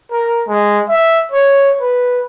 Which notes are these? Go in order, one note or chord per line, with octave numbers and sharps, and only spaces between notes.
A#4
G#3
E5
C#5
B4